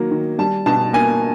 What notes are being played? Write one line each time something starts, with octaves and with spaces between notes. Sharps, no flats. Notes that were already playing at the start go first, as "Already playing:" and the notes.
Already playing: D#3 F#3 A#3
D#3
G3 A5
B2 A5
A#3 G#5